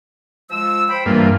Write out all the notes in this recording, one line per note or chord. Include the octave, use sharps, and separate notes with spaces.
F3 G#3 E6
C5 G5 B5
G2 E3 A#3 F4